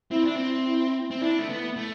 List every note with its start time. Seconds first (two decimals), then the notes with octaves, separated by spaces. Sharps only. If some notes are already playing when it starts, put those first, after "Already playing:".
0.11 C4 E4
0.23 D4
0.36 C4
0.67 E4
1.11 C4
1.21 D4 E4
1.39 A3
1.49 B3
1.77 A3